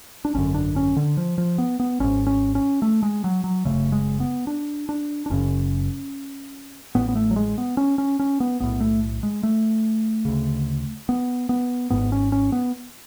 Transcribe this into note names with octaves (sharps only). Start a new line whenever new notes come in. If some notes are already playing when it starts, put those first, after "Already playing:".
D4
G#1 F#2 D3 C#4
D4
C#4
D3
F3
F3
B3
B3
G#1 G#2 C#4
C#4
C#4
A3
G#3
F#3
F#3
F#1 F2 C#3 A3
G#3
B3
D4
D4
D4
F#1 F#2 C#3 C#4
A1 A2 B3
B3
A3
F#3
G#3
B3
C#4
C#4
C#4
B3
B1 A2 B3
A3
G#3
A3
D2 C#3
B3
B3
G#1 G#2 B3
C#4
C#4
B3